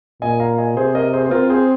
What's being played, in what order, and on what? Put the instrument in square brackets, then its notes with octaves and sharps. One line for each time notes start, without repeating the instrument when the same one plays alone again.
[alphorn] A#2 [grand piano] D#5 G#5
[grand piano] F5 A#5
D#5 G#5
[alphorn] C3 [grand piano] G#4 C5
[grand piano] A#4 D#5
G#4 C5
C5
[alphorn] C4 [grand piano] F4 A#4
[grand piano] G#4 C5